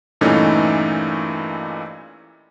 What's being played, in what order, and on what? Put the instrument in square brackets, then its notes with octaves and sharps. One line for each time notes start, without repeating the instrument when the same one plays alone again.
[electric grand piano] G2 A#2 E3 A3 C#4 D#4